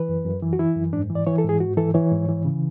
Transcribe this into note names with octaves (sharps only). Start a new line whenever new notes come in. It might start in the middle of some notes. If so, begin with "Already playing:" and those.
Already playing: E3 B4
F#2
F#2
E3
F#4
E3 E4
F#2
G#2 D4
E3
D5
E3 C#5
A4
G#2 G#4
G#2 F#4
E3 A4
E3 C#5
G#2
E3
C#3